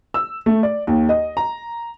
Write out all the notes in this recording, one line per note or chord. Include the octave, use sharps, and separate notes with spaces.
E6
A3
D5
D#2
D#5
A#5